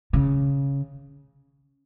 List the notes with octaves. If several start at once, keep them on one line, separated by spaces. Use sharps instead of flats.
C#3